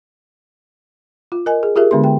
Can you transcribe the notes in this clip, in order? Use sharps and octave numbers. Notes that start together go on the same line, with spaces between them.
F4
A#4 D#5 G#5
G#4
F4 G4 G#4 A#4 E5
D3 G#3 B3 D4 C6
G5